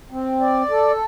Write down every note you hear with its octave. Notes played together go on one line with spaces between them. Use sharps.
C4
D5
A4